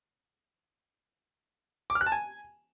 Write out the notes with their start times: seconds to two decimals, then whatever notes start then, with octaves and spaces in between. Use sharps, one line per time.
1.90 D6
1.95 F6
2.01 F#6
2.06 A5
2.12 G#5